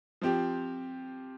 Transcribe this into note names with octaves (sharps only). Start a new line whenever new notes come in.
F3 C4 G4